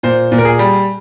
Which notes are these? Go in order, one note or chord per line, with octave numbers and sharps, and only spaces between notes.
A#2 C5
A#2
A#4
G#4
G3